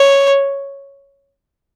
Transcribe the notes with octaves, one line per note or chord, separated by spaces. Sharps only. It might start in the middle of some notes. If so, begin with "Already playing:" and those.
Already playing: C#5